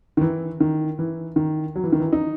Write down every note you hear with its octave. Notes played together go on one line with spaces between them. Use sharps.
D#3
E3
D#3
E3
D#3
F#3
E3
D#3
E3
D#4